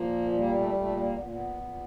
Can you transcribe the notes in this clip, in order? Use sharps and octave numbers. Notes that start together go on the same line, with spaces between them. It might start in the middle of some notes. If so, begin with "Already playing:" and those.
Already playing: A#2 F3 A#3
G3 A#3
A3
A#2 A3
A#3
A#2 B3
A#3
B3
A#2